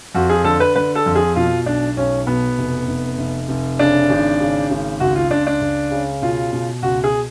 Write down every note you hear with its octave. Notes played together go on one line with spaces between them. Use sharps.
F2 F#4
G#4
D3 A4
B4
D3 B4
A4
F2
G#4
B2 F4
B1 D4
B1 C#4
B2 B3
F1
F1
F1
F1
C#3 D4
G#1
C#3
G#1
C#2 F#4
F4
C#2 D4
D4
C#2
C#3
B2 F4
B2
C#2 F#4
G#4